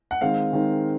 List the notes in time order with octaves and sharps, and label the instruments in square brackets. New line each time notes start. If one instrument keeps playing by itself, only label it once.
[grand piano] F#5
D#3 G#3 C4 F5
D#3 G#3 C4